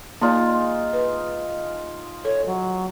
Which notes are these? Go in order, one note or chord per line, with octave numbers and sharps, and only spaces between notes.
G#3 A#3 D#4 F4 D5
B4
A4 C#5
F#3